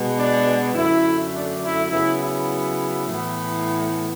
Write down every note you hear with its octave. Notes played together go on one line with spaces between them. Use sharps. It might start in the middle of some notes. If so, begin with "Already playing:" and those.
Already playing: B2 G#3 B3
D4
F#2 D3 A3 E4
D4
E4
C#3 F#3 B3 E4
E4
A2 E3 B3